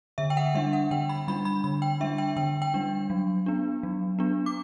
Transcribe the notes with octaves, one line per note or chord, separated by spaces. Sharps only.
D3 E5
G5
F#5
G3 D4 E5
F#5
D3 G5
B5
G3 D4 B5
B5
D3 B5
G5
G3 D4 E5
G5
D3 G5
G5
G3 D4
F#3
B3 D4
F#3
B3 D4
D6